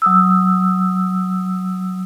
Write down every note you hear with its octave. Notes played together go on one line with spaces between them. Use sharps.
F#3 D#6 E6